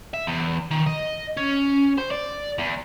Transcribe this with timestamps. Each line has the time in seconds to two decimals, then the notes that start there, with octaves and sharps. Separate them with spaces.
0.14 E5
0.27 E2
0.71 D#3
0.87 D#5
1.37 C#4
1.98 C5
2.11 D5
2.58 E2